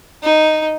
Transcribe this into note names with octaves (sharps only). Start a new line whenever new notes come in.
D#4